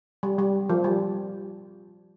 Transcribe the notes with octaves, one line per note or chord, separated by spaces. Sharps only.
G3
G3
F3
G3